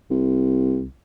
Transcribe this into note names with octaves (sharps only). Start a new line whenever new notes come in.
C2